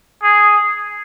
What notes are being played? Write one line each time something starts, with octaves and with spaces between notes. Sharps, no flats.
G#4